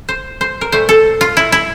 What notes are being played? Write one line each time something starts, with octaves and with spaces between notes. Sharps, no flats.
C5
C5
A#4
A#2 A3 C5
A4
F4
E4
E4